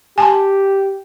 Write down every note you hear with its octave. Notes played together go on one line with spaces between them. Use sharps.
G4 G#5 A5 C6